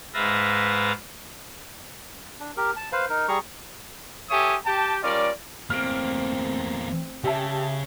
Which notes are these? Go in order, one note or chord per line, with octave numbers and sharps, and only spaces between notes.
G#2 B4 E5 F5 A6 A#6
D4
G4 A#4
A5
B4 C5 F5
D#4 A#4
G3 G#4 A#5 C#6
G4 A4 C#5 E5 G#5 D#6
G4 G5 A5
G3 C#4 F4 A#4 D5
E2 A3 A#3 C4 F6 D7
C#3 G4 E5 A5